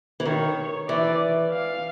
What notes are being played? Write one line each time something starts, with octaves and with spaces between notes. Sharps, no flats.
E3
D#3 C#5
E3 D5
F5